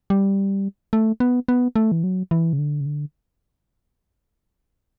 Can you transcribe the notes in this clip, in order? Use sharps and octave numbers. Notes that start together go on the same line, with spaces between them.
G3
A3
B3
B3
A3
E3
F#3
E3
C#3
D3
C#3
D3